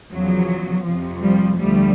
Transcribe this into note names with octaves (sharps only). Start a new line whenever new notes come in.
E2 C#3 F3 F#3
F2 C3 F3
F3 G3
D2 D3 F3 G3 A3